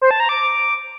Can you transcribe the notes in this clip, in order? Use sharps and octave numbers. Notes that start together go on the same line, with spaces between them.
C5
A5
A#5
D6